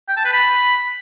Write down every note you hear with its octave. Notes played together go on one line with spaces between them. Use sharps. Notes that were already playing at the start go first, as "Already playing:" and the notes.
G5
A5
B4
B5